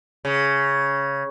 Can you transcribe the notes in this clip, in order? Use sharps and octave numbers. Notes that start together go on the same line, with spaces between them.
C#3